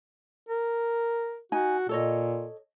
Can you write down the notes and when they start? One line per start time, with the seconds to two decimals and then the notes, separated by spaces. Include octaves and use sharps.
0.48 A#4
1.52 D#4 F#4 G#5
1.89 A#2 A4 C#5 D#5